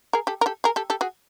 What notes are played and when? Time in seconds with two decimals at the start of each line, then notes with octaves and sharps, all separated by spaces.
0.13 G#4 A#4
0.27 G4 A4
0.41 A#4
0.46 G4 A4
0.64 G#4 A#4
0.76 G4 A4
0.90 G4 A4
1.01 F#4 G#4